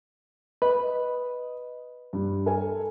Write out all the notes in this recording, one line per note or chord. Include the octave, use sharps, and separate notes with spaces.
B4 D#5
G2
A4 A#4 G#5